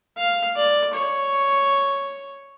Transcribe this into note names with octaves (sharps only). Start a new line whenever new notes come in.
F5
D5
C#5